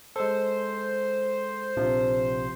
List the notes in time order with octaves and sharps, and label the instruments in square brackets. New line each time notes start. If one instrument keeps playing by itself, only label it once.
[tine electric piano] G#3 A4 [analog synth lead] C5
[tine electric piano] A#1 C3 F3